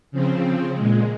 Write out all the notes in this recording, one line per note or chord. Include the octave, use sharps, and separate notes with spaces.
C#3 F3 C4
A#2 G#3